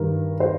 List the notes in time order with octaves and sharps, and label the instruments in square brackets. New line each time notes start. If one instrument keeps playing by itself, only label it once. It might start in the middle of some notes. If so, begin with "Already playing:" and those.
Already playing: [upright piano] G2 D#3 G3 A#4
C5